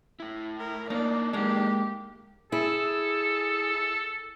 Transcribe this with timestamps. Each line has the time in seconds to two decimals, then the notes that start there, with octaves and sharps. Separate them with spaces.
0.20 A2 E4
0.59 A#4
0.90 A#3 D4 D#4 D5
1.33 G#3 A#3 G4
2.52 E4 G#4 A4